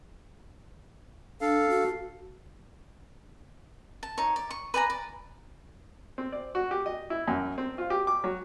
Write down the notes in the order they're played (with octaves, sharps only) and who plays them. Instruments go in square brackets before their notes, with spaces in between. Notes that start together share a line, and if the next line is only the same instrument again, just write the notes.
[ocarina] D4 [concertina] A4 F5
[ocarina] F#4
[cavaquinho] A5
D#4 C#5
D5
C#6
B4 D5 G#5 A#5
D5
[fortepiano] C4
D5
F#4
G4
D#5
E4
F#2
C4
F4
G4
D6
F#3